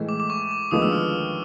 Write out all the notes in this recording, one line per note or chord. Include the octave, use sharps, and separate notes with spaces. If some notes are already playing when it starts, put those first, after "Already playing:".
Already playing: A2 E3 G#3
D6
D6
C#6
D6
D#2 D3 F3 G#3 B3 D#6
E6
F6